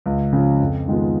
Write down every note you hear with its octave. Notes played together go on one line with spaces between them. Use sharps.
C#2
C#3 F3
F2
D#3 G#3 B3 F4